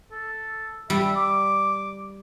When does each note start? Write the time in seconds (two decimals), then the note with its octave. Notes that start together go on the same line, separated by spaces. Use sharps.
0.12 A4
0.90 G3 E5
1.16 D6